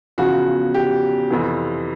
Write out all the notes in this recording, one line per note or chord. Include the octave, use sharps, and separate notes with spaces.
E2 C#3 F3 F#4
G4
F2 C3 E3